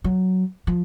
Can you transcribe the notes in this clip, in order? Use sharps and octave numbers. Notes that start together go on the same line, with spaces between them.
F#3
F3